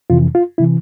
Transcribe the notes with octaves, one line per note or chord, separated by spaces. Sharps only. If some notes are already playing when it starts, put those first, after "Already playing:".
F2 C3 E3 F4
F4
C3 E3 E4